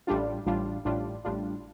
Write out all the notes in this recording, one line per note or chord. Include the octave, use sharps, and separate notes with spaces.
A1 A2 G3 D4 F4
A1 A2 G3 D4 F4
A1 A2 G3 D4 F4
A1 A2 G3 D4 F4